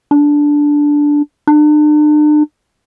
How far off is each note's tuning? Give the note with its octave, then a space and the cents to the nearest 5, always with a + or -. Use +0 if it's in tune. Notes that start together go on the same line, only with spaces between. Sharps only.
D4 -5
D4 +40